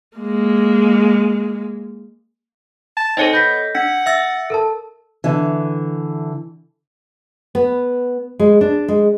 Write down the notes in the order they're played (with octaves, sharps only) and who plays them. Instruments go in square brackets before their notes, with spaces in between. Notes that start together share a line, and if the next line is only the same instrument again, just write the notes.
[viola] G#3 A#3
[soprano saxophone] A5
[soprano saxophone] C4 [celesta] D#4 C5 C#7 [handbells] A4 C#5 D#5
[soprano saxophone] B3 [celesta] G6 A#6 B6
[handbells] D4 [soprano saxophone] F#5
[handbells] E5 E6 A6 [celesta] A#6
[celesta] A4 A#4 A5
[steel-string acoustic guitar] D3 E3
[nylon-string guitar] B3
G#3
D4
G#3